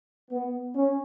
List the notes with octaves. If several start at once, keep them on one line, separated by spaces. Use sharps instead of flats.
B3
C#4